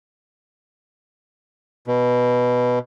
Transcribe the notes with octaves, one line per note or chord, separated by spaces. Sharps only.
B2